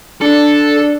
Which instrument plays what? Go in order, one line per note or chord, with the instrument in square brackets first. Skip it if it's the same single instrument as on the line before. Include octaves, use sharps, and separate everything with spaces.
[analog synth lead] D4 [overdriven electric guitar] A4